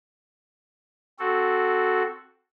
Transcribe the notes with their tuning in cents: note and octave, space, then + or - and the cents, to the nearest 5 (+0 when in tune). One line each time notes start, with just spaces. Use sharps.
C4 +0 F#4 +0 A4 +0